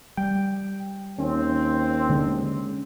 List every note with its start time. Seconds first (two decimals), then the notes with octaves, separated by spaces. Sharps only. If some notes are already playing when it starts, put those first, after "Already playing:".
0.17 G3 G5
1.18 D#2 C4 C#4
2.09 D3 G#3